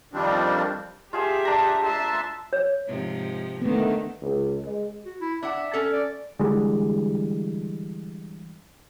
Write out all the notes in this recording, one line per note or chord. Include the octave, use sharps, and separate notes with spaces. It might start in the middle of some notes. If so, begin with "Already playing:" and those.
F2 D#3 F3 G3 C4 D4
F4 G4 G#4 E5 A5
D4 A#5
E5 A5 C6
C#5
G#2 C3 F3
D3 D#3 A3 B3
C#2
G#3
F#4
E4
D4 E5 F#5
C#4 A4
D5
D3 E3 G3 G#3